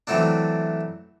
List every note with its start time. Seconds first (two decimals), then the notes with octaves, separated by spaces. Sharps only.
0.07 E3 F#3 A3 C4 D4